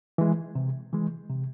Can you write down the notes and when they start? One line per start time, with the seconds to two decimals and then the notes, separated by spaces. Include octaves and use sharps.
0.18 E3 G#3
0.55 C3
0.93 E3 G#3
1.30 C3